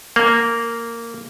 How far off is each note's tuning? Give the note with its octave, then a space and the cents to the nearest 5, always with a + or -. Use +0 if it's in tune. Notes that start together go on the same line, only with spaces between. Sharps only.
A#3 -10